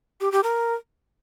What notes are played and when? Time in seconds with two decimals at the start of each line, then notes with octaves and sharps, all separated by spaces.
0.21 G4
0.32 G4
0.43 A#4